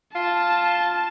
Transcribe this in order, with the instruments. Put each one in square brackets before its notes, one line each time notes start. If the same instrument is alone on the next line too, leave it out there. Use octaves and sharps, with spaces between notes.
[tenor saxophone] F4 [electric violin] A5